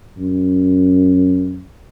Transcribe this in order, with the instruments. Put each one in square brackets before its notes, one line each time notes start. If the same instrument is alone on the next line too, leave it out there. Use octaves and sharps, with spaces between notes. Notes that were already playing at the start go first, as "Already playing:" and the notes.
[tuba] F#2